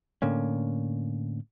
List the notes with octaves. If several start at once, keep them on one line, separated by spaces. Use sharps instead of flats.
A2 D3 A#3 C#4